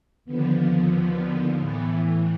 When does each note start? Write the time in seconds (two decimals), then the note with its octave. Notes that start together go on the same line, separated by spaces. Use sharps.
0.25 D#2 D3 F3 B3
1.58 A2 E3 B3